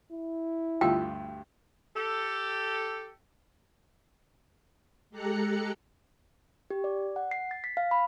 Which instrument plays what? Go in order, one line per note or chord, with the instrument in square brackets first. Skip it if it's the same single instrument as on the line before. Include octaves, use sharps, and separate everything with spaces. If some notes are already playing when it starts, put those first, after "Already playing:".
[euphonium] E4
[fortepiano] D2 G2 E6 [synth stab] F4 [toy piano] G5
[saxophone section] G4 A4
[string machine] G#3 G4 A4 A#5 F#6 C#7
[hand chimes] G4
D5
F#5
C7
A6
B6
F5
B5